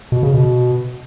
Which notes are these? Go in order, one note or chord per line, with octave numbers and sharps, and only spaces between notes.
B2
C#3
B2